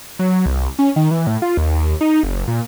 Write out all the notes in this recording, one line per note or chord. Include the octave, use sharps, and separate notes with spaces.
F#3
C2
C#4
D#3
E3
A2
F4
D#2
D#4
F#1
A#2